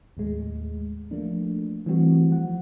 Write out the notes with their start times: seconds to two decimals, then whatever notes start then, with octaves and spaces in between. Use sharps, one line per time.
0.17 D#2 A2 G#3
1.11 F3 A3 A#3 D4
1.86 E3 G3 A3 C4 F#4
2.31 F3 F#5